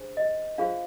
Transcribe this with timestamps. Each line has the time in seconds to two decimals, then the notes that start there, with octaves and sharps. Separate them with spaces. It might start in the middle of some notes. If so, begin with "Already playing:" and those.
Already playing: D4 G#4 C5
0.17 D#5
0.58 D4 F4 G#4 C5 F5